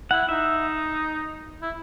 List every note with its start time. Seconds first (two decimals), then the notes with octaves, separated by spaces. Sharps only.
0.11 E4 F#5
0.29 D#4 E5
1.62 E4